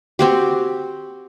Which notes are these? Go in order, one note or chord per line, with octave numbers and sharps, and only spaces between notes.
C4 F#4 G4